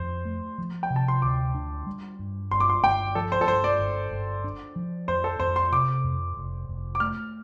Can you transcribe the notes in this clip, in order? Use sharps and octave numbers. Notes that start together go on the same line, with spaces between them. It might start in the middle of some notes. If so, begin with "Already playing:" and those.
Already playing: F2 C5
A3
F3
G5
C3
A5
C6
D2 D6
D4
G3
G2
G1 C6
D6
C6
G1 G5
F3 A4
C5
A4
G2 C5
D5
G1
G1
D4
F3
F2 C5
A4
F2 C5
C6
C3 D6
F2
F1
F1
D6
A3 F6